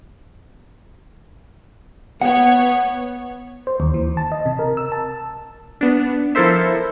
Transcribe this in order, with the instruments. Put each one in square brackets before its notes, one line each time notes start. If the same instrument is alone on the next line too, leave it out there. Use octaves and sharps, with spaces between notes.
[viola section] B3 C#5 [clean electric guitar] F#5
[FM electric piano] C5
D#2
E3
A5
D#5
C3
A#4
E6
A5
[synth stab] B3 D4
F3 E4 A4 A#4 C5 E5